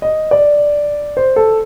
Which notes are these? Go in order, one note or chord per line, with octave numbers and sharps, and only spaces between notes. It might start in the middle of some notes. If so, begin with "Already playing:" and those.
D#5
D5
C5
A4